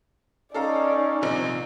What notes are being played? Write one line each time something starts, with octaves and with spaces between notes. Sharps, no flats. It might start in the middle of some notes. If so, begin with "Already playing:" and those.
C#4 D#4 A4 D5 F5 A#5
A#1 C3 F4